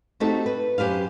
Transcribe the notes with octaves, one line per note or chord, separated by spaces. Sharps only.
A3 C4 D#4 F#4 G4 A4
B4
F#2 G4 B4 C5 F5